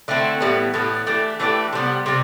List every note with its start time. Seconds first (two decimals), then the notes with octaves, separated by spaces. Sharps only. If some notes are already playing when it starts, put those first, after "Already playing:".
0.08 D3 A3 C4 E4
0.40 A2 E3 G3 B3
0.74 A2 E3 G3 B3
1.07 E3 A3 D4 G4
1.40 E3 A3 D4 G4
1.73 C3 G3 B3
2.06 C3 G3